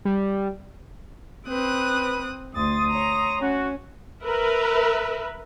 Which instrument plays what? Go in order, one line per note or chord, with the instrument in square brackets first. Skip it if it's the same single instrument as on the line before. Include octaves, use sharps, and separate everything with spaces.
[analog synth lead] G3
[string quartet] C4 D#6 F#6 [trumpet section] B4
[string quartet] D2 A6 [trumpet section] C6 D#6
[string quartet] C#5 A#5
[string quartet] C#4 [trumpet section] F#4
[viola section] A#4 B4 E5